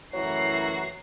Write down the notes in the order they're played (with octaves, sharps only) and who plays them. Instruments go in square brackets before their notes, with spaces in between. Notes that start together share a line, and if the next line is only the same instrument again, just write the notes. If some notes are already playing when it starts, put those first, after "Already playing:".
[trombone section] F#2 A2 E3 [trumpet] F#4 [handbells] C#5 [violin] A#5 C7